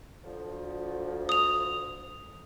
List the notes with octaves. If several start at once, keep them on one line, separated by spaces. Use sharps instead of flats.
D2 F3
D#6 F7